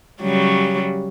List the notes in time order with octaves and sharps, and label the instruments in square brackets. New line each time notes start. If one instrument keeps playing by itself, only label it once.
[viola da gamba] C#3 F#3 G3